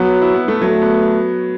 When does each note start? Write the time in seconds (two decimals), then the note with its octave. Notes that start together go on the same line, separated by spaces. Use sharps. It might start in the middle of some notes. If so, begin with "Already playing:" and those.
Already playing: F#3 B3
0.22 E4
0.34 B3
0.48 A3
0.62 F#3 A3
0.82 B3